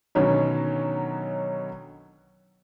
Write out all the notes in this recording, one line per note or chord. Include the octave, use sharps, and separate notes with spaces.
B2 D3 D#3 F#3 C#4 D#4